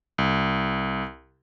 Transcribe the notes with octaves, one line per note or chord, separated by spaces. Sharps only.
C2